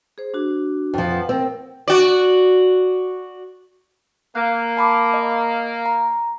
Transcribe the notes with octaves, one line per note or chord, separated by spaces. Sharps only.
G#4 C5
D4 F#4
F2 F3
B4 F#5
C4 A#4 G5
F#4 D5
A#3 F#6
A5 B5 D6
D#5
A#5